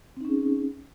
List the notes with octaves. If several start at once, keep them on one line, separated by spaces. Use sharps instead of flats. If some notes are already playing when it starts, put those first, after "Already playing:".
C4 C#4 D#4 G#4